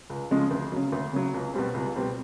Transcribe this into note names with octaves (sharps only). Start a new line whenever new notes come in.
C#2
C#3 F3 G#3 C#4
D2
C#3 F#3
D2
C#3 F#3
C#2
B2 G3 C4
C#2
B2 G3 C4